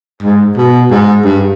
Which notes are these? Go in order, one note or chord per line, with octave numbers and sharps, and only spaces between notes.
G#2
B2
G#2
G2